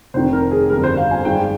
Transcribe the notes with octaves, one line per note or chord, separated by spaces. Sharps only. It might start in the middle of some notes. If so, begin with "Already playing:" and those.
F1 F2 D#3 C5
A#4
G#4
G1 F2 D3 G3 A#4
C5
F5
G#5
G2 D#3 G#3 G5